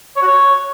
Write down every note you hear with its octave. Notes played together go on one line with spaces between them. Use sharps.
C#5
F#4
C#5